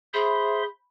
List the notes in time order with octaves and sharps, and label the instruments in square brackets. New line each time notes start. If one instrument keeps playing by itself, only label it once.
[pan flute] G#4 [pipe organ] C5 E5 C6 [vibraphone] B5